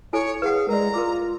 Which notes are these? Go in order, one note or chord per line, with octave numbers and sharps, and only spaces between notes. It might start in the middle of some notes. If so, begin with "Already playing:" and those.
E4 A4 C#5 G#5
G#4 B4 F5 F#5
G#3 A#4 D5 A#5
F4 A#4 D6